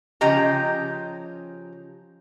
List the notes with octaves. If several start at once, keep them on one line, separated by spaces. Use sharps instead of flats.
C#3 F3 G4 D#5 A#5